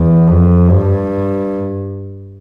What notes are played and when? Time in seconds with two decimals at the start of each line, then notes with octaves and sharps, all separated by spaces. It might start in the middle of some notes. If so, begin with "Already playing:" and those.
Already playing: E2
0.28 F2
0.70 G2